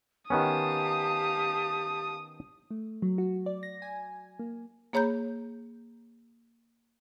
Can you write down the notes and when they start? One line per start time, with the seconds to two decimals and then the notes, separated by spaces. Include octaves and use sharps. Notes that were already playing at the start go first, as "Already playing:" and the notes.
0.30 D#3 B3 C#4 G4 F5 A5 D#6
2.71 A3
3.02 F#3
3.18 F#4
3.46 D5
3.63 A#6
3.82 G#5
4.39 A#3
4.93 A#3 G#4 C#5 A#5 B5 G6